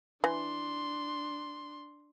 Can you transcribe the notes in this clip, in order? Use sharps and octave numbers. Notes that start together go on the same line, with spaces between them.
E3 D4 C6